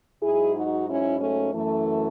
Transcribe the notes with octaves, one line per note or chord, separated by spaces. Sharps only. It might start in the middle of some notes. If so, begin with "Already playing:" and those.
G#2 F#3 E4 G#4
D#4 F#4
C#4 E4
A3 C#4
F#2 E3 A3